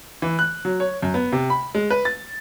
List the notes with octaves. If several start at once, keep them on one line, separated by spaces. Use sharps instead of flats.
E3
F#6
F#3
C#5
F#2
B3
C3
B5
G#3
B4
A6